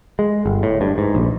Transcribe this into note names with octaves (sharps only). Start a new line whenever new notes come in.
G#3
G1
A2
G2
G#2
A#1